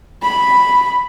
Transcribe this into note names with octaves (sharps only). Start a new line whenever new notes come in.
B5